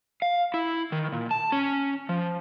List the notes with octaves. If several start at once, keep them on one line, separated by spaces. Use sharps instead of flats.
F5
E4
D#3
A#2
A5
C#4
F3